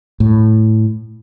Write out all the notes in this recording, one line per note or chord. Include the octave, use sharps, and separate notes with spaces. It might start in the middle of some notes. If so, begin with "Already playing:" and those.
A2